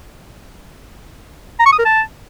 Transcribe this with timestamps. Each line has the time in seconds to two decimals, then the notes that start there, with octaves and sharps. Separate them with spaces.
1.59 A#5
1.66 C#6
1.72 D#6
1.79 A#4
1.85 A5